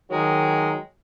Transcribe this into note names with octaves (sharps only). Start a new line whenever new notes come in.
D#3 F#3 G#3